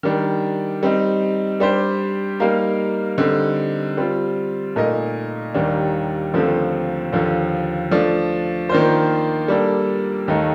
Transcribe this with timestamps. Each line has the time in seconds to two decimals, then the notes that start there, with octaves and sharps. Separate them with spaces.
0.03 D#3 G3 D4
0.83 G3 C4 D#4
1.60 G3 D4 G4 C5
2.40 G3 A#3 D#4 A#4 F5
3.18 D3 G3 C4 D#4
3.97 G3 C4 F4
4.76 A#2 A3 D#4 A#4 D#5
5.55 D#2 D#3 G3 D4
6.34 D#2 D3 F3 A3 C4
7.12 D#2 D3 F3
7.91 F3 A3 D4
8.69 D#3 A#3 D4 F4 C5
9.48 G3 A#3 D4 A4
10.28 D#2 D#3 A3 D#4 A4